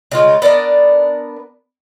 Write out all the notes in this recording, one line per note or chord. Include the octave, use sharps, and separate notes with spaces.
C#3 G#3 F4
B3 D4 A#4 D5